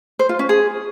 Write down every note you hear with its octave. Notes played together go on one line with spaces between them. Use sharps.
C5
F4
C#4
G#4